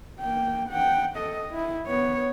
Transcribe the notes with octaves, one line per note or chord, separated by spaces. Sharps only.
A#3 G5
F#5 G5
A4 D#5
E4
B3 C#5